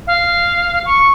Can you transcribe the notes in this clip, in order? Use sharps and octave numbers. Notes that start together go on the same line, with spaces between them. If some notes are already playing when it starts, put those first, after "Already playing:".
F5
C#6